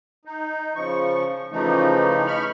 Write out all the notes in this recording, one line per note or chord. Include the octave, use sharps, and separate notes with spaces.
D#4
C#3 F3 C#6
C#3 E3 F3 A3 D#4
B5 C#6 F6